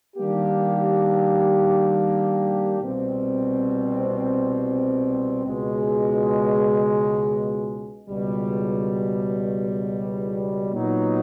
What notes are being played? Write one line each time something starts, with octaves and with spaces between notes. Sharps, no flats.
D#3 G3 A#3 D4 G4
C2 B2 G3 C4
C#2 B2 G#3
C#2 B2 G3
A#2 F#3 B3 D#4